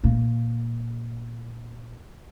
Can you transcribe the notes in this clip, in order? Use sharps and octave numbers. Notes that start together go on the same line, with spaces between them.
A#2 A#3